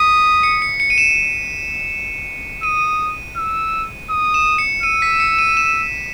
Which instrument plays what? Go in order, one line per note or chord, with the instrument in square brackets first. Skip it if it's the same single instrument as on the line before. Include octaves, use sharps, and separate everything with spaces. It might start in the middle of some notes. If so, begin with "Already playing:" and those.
Already playing: [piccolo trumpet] D#6 [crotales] B6
[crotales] C#7
C#7
C#7
D#7
E7
[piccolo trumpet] D#6 [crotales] D#7
[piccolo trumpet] E6
D#6
[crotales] E7
C#7
[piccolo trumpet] E6 [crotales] D#7
[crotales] B6
C#7
D#7
E7